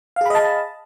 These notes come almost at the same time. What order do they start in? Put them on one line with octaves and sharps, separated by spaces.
F5 G#4 B5 D#5 A5